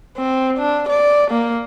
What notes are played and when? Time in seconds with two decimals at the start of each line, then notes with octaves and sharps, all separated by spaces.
0.17 C4
0.58 D4
0.89 D5
1.31 A#3